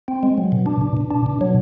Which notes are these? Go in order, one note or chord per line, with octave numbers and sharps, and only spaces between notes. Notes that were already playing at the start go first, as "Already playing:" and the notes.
C4
G#3
F#3
B2
D4
B2
B2
D4
B2
F#3